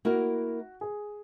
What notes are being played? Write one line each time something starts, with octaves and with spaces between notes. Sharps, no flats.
A#3 E4 F#4 A#4
G#4